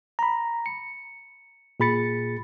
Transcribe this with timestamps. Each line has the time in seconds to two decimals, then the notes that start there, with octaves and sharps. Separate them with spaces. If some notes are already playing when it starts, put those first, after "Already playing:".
0.19 A#5 B5
0.66 C#7
1.80 A#2 G#4 B5 A6 C#7